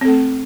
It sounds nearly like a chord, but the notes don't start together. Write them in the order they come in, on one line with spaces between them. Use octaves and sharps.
C4 A4 A3